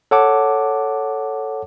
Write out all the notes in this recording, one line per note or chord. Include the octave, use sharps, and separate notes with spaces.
A4 C#5 F#5 A5 D6